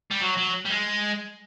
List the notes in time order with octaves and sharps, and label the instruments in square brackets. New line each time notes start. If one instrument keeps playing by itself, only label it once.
[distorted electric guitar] G3
F#3
F#3
G3
G#3